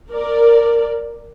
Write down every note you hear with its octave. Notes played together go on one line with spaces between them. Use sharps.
A#4 D5